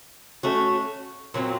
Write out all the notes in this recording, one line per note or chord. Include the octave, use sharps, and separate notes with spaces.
A3 C#4 F#4
A#2 F#3 C4